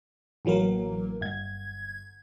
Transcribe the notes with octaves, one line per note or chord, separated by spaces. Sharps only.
A1 E3 F#3 A#3 A#4
G1 G#6